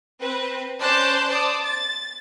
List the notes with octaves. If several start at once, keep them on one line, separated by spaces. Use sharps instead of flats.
C4 B4
C#4 C5 D5 A5 F#6 G6
C5 D5 A5 D6 D#6
A6